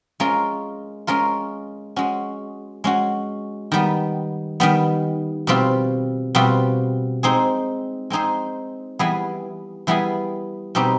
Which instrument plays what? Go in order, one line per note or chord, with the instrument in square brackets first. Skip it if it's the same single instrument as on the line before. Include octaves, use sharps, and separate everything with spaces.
[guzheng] G#3 C#4 F4 A#4
G#3 C#4 F4 A#4
G#3 C#4 F#4
G#3 C#4 F#4
D#3 G3 B3
D#3 G3 B3
B2 G3 C4 F4
B2 G3 C4 F4
G#3 C4 D#4 G#4 C5
G#3 C4 D#4 G#4 C5
E3 G3 B3 E4 G#4
E3 G3 B3 E4 G#4
B2 G3 C4 D#4 G4